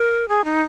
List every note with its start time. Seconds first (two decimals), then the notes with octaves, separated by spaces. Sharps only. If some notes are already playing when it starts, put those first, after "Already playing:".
Already playing: A#4
0.29 G#4
0.45 D#4